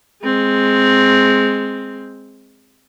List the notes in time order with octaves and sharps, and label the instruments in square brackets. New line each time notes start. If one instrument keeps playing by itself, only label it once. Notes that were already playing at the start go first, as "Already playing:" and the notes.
[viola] G#3 C4